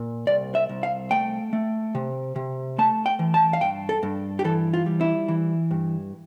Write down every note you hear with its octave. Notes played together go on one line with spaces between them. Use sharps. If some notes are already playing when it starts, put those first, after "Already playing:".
Already playing: A#2
C2 D5
E5
C2
F5
A3 G5
A3
C3
C3
A3 A5
G5
E3
A5
F5
G2 G5
A4
G2
G4
E3 A4
F4
G3
E4
E3
G2